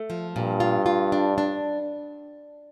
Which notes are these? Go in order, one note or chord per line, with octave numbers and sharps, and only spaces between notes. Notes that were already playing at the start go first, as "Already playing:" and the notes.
Already playing: A3
F3
G2 A#2
F4
F4
D4
D4